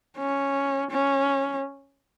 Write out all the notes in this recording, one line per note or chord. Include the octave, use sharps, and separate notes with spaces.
C#4
C#4